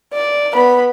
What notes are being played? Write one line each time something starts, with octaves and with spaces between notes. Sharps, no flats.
D5
B3 B5